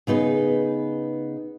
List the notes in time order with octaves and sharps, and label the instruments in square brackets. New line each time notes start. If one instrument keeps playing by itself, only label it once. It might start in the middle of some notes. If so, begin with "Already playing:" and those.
[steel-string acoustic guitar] C#3 B3 D#4 G#4 B4